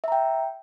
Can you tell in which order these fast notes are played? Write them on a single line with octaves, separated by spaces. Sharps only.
E5 A#5 G5